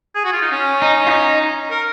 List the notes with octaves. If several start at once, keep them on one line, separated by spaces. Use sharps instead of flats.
G#4
F#4
F4
D#4
C#4
D#4
F4
D#4
A#4